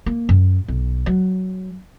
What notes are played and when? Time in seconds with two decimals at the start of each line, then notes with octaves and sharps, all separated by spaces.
0.06 A#3
0.29 F#2
0.68 B1
1.06 F#3